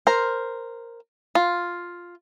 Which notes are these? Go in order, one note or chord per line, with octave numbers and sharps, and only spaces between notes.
A#4 C5
F4